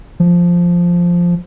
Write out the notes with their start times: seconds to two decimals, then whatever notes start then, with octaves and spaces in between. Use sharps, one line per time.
0.20 F3